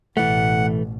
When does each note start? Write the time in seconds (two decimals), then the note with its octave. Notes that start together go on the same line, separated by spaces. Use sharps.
0.17 A1 B2 E3 A3 F#5